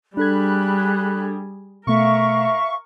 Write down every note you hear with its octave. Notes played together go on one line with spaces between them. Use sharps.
G3 D4 G#4 A4 B5 F#6 G#6
B2 A3 A#4 E5 F5 C#6